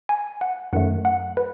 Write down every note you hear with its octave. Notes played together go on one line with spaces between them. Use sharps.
G#5
F#5
F#2 D#3 F#3 A3 F#5
F#5
B4